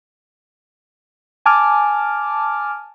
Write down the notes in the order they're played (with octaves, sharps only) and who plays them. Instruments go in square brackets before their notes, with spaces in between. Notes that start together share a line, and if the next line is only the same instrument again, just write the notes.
[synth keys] G#5 A5 D6 F6